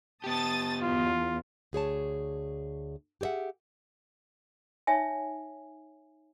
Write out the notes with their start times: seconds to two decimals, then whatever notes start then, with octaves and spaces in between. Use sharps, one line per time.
0.24 B3 G4 A5 D#6 A6
0.81 E2 F4
1.73 D2 G#4 C#5 A5
3.21 G4 G#4 C#5 E5 F#5
4.87 D#4 C#5 E5 G#5